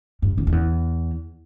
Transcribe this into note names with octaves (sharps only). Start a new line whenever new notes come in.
G2
E2
F2
E2